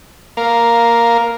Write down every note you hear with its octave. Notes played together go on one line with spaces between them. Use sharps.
A#3 A#4 F5